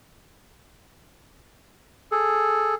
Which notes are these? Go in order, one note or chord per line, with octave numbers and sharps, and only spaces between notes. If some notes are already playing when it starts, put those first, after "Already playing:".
G#4 A4